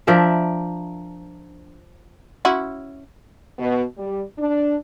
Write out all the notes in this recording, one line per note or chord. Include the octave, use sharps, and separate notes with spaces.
F3 D4 A#4 E5
C#4 E4 F#4
B2
G3
D4